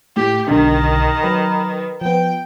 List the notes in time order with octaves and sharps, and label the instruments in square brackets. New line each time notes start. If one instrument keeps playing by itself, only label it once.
[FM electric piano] A2 [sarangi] G4
[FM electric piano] B1 D3 [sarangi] D#3
[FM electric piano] F#3 B4 A#5
[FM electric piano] F3 B3 [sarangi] G5